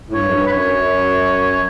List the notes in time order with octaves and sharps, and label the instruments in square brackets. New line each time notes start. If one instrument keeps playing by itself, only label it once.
[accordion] A2
[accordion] G2 [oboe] C#5
[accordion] F#2
G2
[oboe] B4
[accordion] F#2 [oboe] C#5